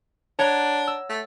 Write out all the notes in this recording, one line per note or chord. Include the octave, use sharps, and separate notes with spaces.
D4 C#5 F#5 A#5
E6
A3